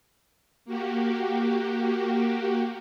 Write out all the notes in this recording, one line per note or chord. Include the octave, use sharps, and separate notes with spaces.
A#3 F#4 G4